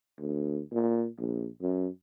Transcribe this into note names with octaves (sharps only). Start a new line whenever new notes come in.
D2
A#2
A#1
F#2